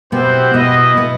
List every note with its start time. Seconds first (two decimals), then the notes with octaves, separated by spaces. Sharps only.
0.12 B2 B3 C4 E4 G4 C5 F#5
0.54 B2 B3 E4 B4 D#5
0.97 B2 B3